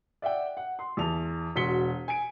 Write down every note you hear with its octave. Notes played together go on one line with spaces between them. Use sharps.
D5 E5 F#5 G5
F#5
C6
E2 A5 F7
E1 F#4 C6 B6 C#7 G7
G#5 D7